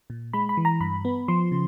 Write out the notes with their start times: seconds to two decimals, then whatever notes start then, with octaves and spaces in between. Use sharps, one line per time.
0.10 A#2
0.33 G#3 B5
0.49 B5
0.57 E3
0.65 A#5
0.81 G2 B5
1.05 B3
1.28 F3 C6
1.52 C#3